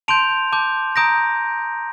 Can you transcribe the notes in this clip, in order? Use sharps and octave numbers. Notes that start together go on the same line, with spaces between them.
A5 C6 G6 D7 F7
A5 D6 G6
A#5 D#6 G6 A#6 D7